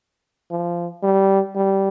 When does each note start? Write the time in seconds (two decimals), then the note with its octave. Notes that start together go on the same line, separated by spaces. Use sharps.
0.51 F3
1.03 G3
1.55 G3